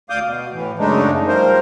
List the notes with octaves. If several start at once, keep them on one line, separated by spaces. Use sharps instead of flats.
D2 D5 F5 D6 D#6 G6
B2
A2 E3
F#2 C#3 G#3 A3 D4 D#4
F3 G3 A#4 C5